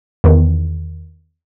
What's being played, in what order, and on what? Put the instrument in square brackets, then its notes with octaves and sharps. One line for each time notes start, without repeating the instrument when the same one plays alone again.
[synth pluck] E2 D#3